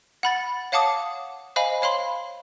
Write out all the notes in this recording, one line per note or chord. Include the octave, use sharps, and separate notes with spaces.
F#5 B5 A6
C#5 F5 F#5 A5 D6 D#6
C5 D#5 F5 G#5 B5
C#5 F5 B5 C6